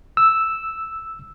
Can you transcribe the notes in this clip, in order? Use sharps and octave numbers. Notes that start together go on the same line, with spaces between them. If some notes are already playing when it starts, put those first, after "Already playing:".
E6